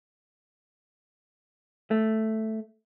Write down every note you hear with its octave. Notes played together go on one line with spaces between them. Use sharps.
A3